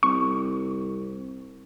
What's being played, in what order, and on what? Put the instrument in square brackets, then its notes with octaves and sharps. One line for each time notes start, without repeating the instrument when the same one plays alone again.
[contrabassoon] C2 [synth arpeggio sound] C#6